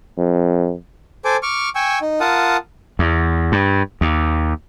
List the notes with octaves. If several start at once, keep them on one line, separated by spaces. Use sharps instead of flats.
F2
A4 C5 G#5 D6
C#6 D6 F6
G5 G#5 C#6 E6
D#4
F4 A#4 F#5 A5 D#6
E2
G2
D#2